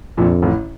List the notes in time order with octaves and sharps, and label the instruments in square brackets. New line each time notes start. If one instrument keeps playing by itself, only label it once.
[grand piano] A#1 A#2 [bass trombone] F2
[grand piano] A1 A2